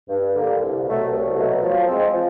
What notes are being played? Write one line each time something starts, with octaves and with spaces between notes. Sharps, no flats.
G2
D3 G3 A#3
C2
B2 F#3 A3
C2
B2 F#3 A3
F3
G#3 C4
F3